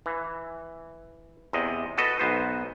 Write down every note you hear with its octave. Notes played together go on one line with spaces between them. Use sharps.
E3
E2 C3 D#5
F#4 A4 B4 D#5
B1 B3 C5